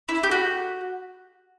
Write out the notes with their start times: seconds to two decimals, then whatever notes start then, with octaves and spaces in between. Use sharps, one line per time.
0.09 E4
0.23 G4
0.31 F#4